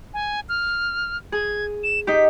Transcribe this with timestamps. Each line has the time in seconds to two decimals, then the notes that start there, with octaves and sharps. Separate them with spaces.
0.14 G#5
0.49 F6
1.32 G#4 G#6
1.84 E7
2.07 D#4 G4 B6